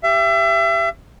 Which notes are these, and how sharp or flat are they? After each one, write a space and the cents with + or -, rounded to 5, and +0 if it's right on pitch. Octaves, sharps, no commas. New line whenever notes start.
G4 +0 E5 +35